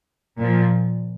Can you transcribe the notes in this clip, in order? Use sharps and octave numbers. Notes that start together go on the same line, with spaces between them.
A#2 F3